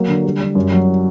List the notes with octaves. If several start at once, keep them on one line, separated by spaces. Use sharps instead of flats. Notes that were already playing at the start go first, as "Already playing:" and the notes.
Already playing: F#3 A#3
D3
G3
G3
F#2
F#3